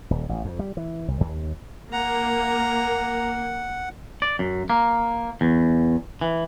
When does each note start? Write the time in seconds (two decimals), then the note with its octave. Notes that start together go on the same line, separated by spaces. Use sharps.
0.11 D#1
0.29 A1
0.45 F2
0.59 G3
0.77 E3
1.08 C2
1.21 D#2
1.93 A#3 F#5 A#5
4.22 D5
4.39 F#2
4.70 A#3
5.41 E2
6.21 E3